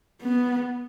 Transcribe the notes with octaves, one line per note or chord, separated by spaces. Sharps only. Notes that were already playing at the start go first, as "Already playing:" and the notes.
B3